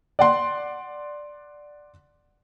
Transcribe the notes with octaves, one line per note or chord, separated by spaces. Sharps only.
D5 F#5 C6